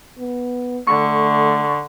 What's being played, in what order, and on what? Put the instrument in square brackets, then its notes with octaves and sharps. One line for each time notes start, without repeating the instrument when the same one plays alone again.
[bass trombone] B3
[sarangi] D3 [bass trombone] A3 [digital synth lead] C#6